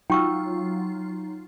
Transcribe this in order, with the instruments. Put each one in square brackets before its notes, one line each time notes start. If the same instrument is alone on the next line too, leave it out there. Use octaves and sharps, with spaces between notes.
[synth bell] F#3 F4 [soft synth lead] D#4 [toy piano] G5 C#6 E6